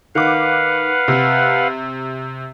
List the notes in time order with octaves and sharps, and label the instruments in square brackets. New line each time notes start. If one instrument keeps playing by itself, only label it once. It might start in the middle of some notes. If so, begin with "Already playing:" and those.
[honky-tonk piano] D#3 D6 [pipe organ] B4 F5 F#5
[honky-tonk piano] C3